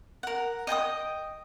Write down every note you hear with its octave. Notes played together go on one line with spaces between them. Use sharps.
A#4 F#5
D#5 G5 G#5 D#6